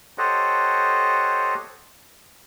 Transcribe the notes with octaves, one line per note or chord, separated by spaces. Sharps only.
G4 A4 C5 C#5 D#5 F#5